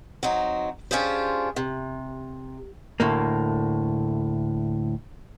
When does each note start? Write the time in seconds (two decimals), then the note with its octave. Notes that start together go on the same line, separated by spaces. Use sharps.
0.23 F#3 C4 D#4
0.91 C#4 D4 F4 G4 G#4 C5
1.56 C3
3.00 D2 A2 A#3